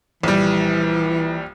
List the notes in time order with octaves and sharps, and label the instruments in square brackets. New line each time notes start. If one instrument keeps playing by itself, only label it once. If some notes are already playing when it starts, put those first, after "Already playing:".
[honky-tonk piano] A#1 G3 [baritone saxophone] E3